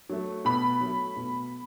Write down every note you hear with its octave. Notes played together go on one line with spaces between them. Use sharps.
F#3 A3
B2 B5
F#3 A3
B2